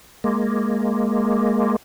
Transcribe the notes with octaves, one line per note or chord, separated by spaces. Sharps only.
G#3 A#3